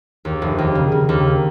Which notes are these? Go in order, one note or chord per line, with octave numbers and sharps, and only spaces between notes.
D#2
F1
D#2
C#3
C#3
D#2